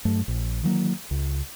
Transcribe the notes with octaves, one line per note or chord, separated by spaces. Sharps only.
G2 F#3 A3
A#1
D#3 E3 F#3 A#3
C#2